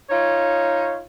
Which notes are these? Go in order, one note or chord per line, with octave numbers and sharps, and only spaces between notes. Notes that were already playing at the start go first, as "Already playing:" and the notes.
D#4 F4 C#5